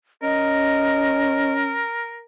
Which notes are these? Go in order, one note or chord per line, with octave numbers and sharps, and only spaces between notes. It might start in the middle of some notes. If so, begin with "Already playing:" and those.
C#4 A#4 D#5